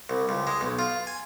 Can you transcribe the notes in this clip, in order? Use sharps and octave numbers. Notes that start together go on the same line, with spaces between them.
C2
C#2
G#3
B1
F4
G#5